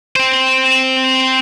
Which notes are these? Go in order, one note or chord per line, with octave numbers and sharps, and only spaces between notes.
C4 C5